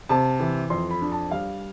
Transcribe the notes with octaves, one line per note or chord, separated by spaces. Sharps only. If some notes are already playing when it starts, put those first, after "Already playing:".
C3 A5
E3
F2 C6
B5
D4
A5
G3 F5